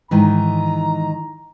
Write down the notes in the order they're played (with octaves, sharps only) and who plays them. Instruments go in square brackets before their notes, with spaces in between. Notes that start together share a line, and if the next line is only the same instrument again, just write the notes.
[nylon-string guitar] G#2 D#3 E3 [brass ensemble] A#5